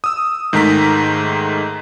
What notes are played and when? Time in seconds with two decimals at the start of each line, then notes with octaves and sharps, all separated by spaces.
0.04 D#6 E6
0.53 G#2 D#3 G#3 A3 A#5 B6